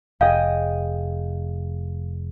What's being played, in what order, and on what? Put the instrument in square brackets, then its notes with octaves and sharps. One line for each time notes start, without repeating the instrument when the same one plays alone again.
[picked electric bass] F1 [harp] G#4 D#5 G5 [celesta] F5